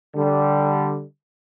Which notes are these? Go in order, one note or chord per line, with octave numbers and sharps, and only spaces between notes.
D3 G3